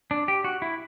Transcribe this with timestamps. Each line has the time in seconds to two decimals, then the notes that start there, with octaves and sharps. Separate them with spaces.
0.11 D4
0.28 G4
0.44 F#4
0.62 E4